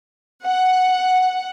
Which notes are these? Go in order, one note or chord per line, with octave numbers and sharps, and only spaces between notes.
F#5